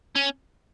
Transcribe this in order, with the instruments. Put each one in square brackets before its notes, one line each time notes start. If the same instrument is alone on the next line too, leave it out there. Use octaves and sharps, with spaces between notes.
[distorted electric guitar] C#4